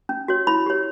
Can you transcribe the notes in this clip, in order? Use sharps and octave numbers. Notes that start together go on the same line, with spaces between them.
C#4
F#4 C#5
E4 B5
G4 C#5